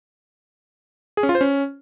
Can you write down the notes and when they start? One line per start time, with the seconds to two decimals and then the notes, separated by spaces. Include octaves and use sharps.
1.17 G#4
1.23 C#4
1.29 F4
1.35 C5
1.41 C#4